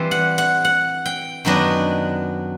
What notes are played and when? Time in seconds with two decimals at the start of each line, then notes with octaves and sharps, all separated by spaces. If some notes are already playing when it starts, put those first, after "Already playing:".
Already playing: E3 G3 C4 F4
0.11 F#5
0.38 F#5
0.65 F#5
1.06 G5
1.45 F#2 D#3 F#3 B3 D4 D#5